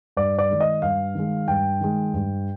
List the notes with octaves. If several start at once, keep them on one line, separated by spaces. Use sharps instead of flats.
G2 D5
D5
D#3 G#3
D#5
G2 F5
D#3 G#3
G2 G5
D#3 G#3
G2